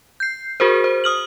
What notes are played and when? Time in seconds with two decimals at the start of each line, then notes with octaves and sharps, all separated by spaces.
0.20 G6 C7
0.60 F#4 G#4 A#4 C5
0.84 C5
1.04 D#6 F6 F#7